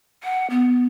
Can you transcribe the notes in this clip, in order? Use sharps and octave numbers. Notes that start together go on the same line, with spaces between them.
F#5
B3